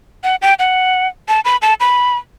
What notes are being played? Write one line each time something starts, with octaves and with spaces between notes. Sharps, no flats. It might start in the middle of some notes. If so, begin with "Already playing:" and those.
F#5
G5
F#5
A5
B5
A5
B5